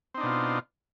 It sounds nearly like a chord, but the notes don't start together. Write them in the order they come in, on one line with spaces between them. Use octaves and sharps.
C4 D#4 D4 B2 F4